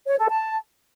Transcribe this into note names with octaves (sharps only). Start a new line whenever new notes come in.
C#5
A4
A5